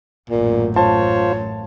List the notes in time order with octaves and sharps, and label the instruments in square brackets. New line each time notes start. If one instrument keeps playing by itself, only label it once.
[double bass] A1 F#2 [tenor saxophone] A#2
[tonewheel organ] F4 C5 [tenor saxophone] C#5 [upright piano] A5